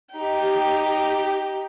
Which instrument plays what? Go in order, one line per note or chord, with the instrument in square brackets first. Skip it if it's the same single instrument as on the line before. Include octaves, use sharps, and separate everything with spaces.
[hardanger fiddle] D#4 G5 [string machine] G4